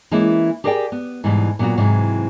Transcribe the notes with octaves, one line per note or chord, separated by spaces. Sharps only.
E3 G#3 A#3 C#4 E4
G4 G#4 A#4 D5 F#5 G5
B3
G#2 B2 E3 G3
A#2 F#3 B3 F4 F#4
G#2 C3 E3 F#3